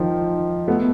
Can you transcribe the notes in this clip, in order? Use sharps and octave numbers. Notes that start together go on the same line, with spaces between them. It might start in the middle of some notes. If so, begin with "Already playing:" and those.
Already playing: D#3 F3
A3 B3